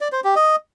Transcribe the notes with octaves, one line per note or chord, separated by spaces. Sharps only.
D5
C5
G4
D#5